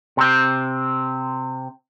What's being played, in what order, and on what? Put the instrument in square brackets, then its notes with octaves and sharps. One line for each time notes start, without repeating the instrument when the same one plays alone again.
[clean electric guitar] C3 C4